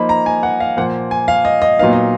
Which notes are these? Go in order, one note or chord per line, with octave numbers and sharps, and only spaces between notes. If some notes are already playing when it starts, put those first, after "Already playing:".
Already playing: F3 A#3 D#4 B5
A#5
G#5
F#5
F5
A#2 F3 A#3 F#5
G#5
F5
D#5
D#5
A#2 F#3 B3 D#4 F5
D#5